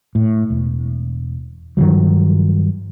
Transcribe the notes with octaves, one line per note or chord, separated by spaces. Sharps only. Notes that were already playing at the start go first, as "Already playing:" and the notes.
A2
E1
G2 D#3 F3 F#3